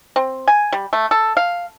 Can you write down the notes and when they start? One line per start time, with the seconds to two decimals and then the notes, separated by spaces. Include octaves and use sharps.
0.16 C4
0.48 G#5
0.72 G3
0.93 A3
1.11 A4
1.37 F5